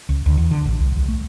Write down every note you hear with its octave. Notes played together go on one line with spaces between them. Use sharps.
C#2
D2
E2
D3
A1
C2
C2
A3